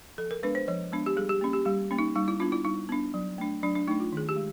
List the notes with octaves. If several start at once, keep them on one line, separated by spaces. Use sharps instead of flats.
F3 A4
A#4
G#3 B3 D4 B4
C5
F3 C#5
G#3 B3 D4
G4
G3 G#4
G4
A#3 C#4
G4
G3 G4
A#3 C#4
D#4
G3 D#4
E4
B3 D4 F4
E4
G3 D#4
B3 D4
F#3
A3 D4
F#3 D4
D4
A3 D4 D#4
F4
D#3 G#4
G4
G#3